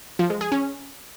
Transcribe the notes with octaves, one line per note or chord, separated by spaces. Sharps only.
F3
G#3
G#4
C#4